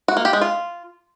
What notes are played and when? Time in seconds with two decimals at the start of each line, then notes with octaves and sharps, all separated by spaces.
0.08 F#4
0.17 A#3
0.25 G4
0.33 G#3
0.42 F4